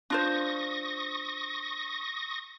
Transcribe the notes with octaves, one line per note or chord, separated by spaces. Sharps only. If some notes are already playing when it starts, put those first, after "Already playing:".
D4 F4 C5 C#6 D#6 A#6